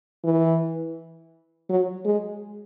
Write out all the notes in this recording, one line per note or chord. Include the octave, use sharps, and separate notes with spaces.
E3
F#3
G#3